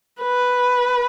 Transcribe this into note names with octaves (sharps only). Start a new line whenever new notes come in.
B4